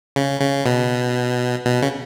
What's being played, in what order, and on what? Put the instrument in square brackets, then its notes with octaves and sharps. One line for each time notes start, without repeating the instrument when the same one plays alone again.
[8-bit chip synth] C#3
C#3
B2
B2
C#3